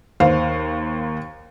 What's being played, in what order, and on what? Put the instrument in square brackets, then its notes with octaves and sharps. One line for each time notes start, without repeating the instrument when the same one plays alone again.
[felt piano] D#2 C5 F5